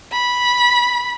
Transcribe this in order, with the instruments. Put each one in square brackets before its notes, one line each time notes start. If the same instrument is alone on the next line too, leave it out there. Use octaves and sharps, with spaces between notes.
[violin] B5